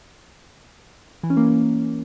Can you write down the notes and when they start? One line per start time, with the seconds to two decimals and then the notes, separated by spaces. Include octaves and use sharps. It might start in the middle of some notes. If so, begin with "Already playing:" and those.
1.23 E3
1.30 C#4
1.37 A#3